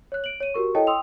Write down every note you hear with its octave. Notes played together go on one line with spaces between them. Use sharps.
C#5 F#6
D7 F#7
C#5 D#7
F#4 G4 A#4 C#6
E4 A4 C#5 D#5 G5 A5
G5 C6 D#6 E6 F7